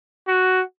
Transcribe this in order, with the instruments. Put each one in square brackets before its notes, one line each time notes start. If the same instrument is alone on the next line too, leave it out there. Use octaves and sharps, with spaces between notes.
[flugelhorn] F#4